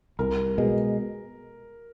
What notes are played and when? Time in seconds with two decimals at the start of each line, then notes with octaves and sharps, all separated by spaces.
0.19 C2 A#4
0.58 B2 G#3